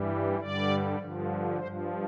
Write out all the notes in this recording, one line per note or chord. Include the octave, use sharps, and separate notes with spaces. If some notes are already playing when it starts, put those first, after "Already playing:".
Already playing: G2 E3 G3
G2 D3 G3 D5
G2 D3 F3
G2 F3 C5